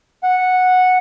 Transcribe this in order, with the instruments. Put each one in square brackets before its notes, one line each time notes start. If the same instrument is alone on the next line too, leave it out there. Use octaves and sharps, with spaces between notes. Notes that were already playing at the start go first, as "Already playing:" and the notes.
[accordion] F#5